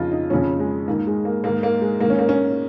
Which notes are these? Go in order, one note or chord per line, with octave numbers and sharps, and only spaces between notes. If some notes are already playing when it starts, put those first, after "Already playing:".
Already playing: F2 C#3 D#4 F4
D#4
F2 C#3 C#4
G#3
G#2 D#3 A#3
G#3
A#3
G#2 D#3 A#3
A#3
G#3
G#2 D#3 A#3
C#4
A#3
C#4